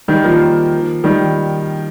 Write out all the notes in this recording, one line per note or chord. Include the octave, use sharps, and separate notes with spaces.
D#3 G3
F3 A#3
D#3 G3